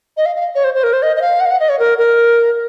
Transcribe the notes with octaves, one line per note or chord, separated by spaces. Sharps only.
D#5
F5
F5
C#5
C5
C5
A#4
C5
D#5
D#5
F5
F#5
F5
F#5
D#5
C#5
A#4
A#4